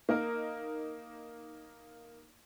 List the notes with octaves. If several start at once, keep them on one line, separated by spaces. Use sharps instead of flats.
A#3 D#4 A#4